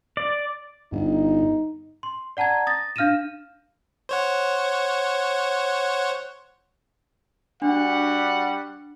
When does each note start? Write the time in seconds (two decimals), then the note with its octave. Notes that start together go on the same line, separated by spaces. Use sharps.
0.17 D5
0.92 G1 G2 D#4
2.03 C6
2.37 D5 F#5 A5 A#5 G#6
2.67 D#6 A6 A#6
2.96 D4 F5 F6 A#6 D#7 E7
4.09 C5 C#5 F#5
7.62 G3 D4 F#4 F#5